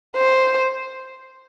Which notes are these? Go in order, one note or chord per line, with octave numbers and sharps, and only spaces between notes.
C5